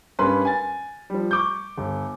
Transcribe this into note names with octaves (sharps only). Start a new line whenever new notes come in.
G2 C#4 A#4 B4 C6
G#5 A6
F3 G3
C#6 D6 G6
G1